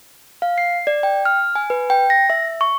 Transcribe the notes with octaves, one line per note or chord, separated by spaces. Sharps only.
F5
C7
D5
G5
F6
G#5
B4
G5
A#6
E5
C#6